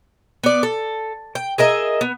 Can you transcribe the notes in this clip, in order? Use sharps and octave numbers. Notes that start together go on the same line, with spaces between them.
B3 D5
A4
G5
G#4 A#4 D#5 E5
B3